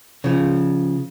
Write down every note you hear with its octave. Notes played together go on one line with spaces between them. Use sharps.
C#3 F3